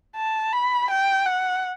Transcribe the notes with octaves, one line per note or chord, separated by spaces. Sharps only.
A5
B5
G5
F#5